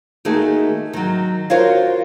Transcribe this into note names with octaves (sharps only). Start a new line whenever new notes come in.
D#3 A3 A#3 D#4 F#4 G#4
D#3 F#3
F4 F#4 A#4 C5 C#5 F5